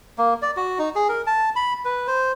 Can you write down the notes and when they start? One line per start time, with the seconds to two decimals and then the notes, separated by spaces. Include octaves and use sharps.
0.18 A#3
0.42 D5
0.57 F#4
0.79 D#4
0.96 G#4
1.09 A#4
1.27 A5
1.56 B5
1.85 B4
2.07 C5